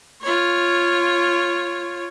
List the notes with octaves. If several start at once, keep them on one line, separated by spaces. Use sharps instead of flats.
F4 C#5